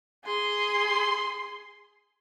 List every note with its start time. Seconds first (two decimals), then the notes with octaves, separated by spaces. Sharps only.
0.25 G#4 C6